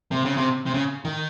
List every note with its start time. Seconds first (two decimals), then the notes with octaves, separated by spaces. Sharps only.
0.11 C3
0.25 C#3
0.37 C3
0.66 C3
0.74 C#3
1.05 D#3